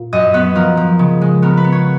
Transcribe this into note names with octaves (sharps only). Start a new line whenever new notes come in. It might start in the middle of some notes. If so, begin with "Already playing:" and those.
Already playing: A#2
F#2 D#5
B3 B4
F3 A#4
F3
C#3
G#3
B3 A#4
B4
B3
C#5